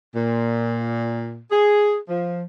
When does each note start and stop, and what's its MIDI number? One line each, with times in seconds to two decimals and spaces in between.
0.15 1.39 46
1.50 1.96 68
2.08 2.42 53